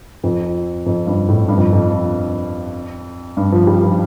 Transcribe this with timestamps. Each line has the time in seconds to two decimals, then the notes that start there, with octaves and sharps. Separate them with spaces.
0.23 F2
0.86 F2
1.07 G2
1.29 A2
1.48 G2
1.57 F2
1.73 F2
3.37 G2
3.52 F3
3.67 G3
3.83 F3